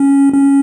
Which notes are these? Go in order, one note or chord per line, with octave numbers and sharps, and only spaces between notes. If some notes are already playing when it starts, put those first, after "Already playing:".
Already playing: C#4
C#4